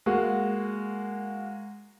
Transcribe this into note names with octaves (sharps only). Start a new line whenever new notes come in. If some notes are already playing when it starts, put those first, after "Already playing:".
G#3 A#3 F#4